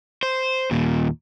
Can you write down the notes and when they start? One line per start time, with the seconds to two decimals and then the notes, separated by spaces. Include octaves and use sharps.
0.23 C5
0.71 D#2 A#2